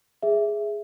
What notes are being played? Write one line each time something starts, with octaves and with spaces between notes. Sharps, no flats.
G#4 E5